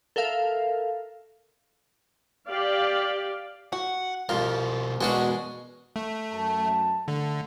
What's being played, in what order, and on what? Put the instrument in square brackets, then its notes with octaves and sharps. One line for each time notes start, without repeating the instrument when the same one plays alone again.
[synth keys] A4 A#4 E5 F5
[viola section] G4 D5 F5
[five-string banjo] F#4 [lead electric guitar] F#5
[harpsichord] C2 F2 F3 [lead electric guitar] B2 A#4 [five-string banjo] F5
[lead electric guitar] E2 A#4 [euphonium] B2 [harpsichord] G#3 C#4 G#4 [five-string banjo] D4 F#4
[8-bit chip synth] A3
[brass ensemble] F#2 A5
[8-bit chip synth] D3 [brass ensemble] A3